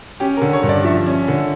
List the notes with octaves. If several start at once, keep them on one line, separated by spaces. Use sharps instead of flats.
C#4 G4
A#4
D3
C#5
G2
D5
F3 E5
C#4
D3